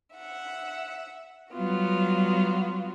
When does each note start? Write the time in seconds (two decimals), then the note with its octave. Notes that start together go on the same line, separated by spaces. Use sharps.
0.13 E5 F#5
1.52 F#3 G3 B3 F4 F#4